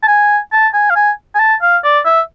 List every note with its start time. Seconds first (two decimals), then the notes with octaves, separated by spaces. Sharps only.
0.02 A5
0.07 G#5
0.52 A5
0.73 G#5
0.90 F5
0.95 G#5
1.35 G#5
1.39 A5
1.62 F5
1.84 D5
2.05 E5